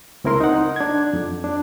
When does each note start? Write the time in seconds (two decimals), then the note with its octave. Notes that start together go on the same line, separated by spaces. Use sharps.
0.24 C#2 C4 E4 A#4 C6
0.40 D#4 F#5
0.76 D4 G#6
1.13 F2
1.44 D4